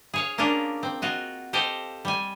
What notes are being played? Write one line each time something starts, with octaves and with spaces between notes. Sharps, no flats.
G#4 C#5 F5
A#3 C#4 D4 F4 A#4
C4
F4 F#4 D#5
G4 A4 C5 D#5 F5 G5
G3 G#5